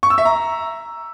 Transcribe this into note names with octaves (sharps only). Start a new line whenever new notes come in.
C#6
E6
E5
A#5